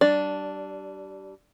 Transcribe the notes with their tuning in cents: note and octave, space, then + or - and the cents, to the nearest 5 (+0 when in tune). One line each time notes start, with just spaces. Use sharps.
G3 -25 D4 +0 D5 +0